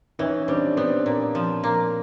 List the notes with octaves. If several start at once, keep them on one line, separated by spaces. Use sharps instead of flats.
E3 C#4 D#4
G3 C4 D4
B3 C4 D4
A#2
F3
A#3